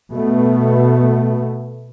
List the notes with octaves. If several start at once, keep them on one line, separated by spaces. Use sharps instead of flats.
B2 A3 B3